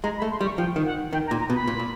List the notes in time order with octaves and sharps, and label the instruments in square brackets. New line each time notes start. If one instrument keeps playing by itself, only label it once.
[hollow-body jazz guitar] G#3 [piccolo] A#5
[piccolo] B5
[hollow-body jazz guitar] A3
[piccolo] C6
[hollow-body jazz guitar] G3
[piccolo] C#6
[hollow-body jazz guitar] F3 [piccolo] G5
[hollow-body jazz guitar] D#3
[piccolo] F#5
[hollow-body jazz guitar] D#3 [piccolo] G5
[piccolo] A#5
[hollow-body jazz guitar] A#2
[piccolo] A#5
[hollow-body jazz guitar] B2
[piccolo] B5
[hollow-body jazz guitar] A#2
A#2